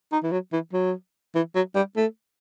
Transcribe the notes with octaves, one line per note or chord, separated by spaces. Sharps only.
D#4
E3
F#3
E3
F#3
E3
F#3
G3
A3